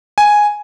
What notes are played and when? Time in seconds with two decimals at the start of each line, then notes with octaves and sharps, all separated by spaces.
0.18 G#5